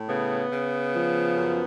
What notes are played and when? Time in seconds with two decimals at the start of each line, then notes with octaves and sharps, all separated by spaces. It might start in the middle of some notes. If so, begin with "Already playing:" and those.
Already playing: A2
0.08 C#3 B3
0.51 C#3
0.94 F3
1.37 F#2